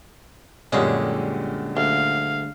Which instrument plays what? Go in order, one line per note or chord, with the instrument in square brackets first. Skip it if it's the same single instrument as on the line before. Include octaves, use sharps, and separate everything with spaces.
[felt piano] F#2 A#2 G4 [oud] D3 G3 G#3 [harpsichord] C#4
[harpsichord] D2 [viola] F5